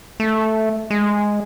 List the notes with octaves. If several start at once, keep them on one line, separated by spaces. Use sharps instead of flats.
A3
G#3